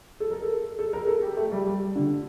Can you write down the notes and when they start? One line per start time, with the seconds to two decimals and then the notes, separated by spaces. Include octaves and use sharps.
0.20 A4
0.31 A#4
0.42 A4
0.79 A4
0.93 A#4
1.07 A4
1.22 G4
1.37 A3
1.52 G3
1.66 G3
1.96 D3